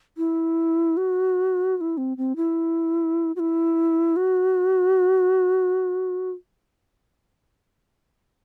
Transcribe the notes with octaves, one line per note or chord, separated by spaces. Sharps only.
E4
F#4
F#4
E4
C4
C4
E4
F#4
E4
F#4